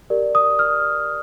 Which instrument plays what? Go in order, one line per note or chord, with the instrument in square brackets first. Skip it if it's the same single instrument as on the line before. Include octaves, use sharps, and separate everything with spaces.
[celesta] G4 A#4 D5
D#6
F6